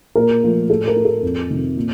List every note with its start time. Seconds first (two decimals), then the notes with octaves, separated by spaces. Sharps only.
0.15 A#2 A#4
0.43 F3 A3
0.69 A2 A4
0.88 A#4
0.96 A3
1.05 A4
1.22 F2
1.50 C3 D#3
1.76 A#2